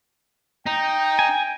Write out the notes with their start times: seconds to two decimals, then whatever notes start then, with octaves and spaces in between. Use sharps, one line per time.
0.66 D#4 G5
1.19 G#5